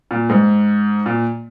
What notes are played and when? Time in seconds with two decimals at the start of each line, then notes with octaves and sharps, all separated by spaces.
0.11 A#2
0.29 G#2
1.06 A#2